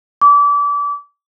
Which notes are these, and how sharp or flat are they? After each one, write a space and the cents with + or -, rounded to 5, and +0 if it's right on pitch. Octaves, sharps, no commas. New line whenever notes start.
D6 -30